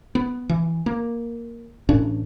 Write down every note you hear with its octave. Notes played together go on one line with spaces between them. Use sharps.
B3
E3
A#3
A1 A2 C#4 D4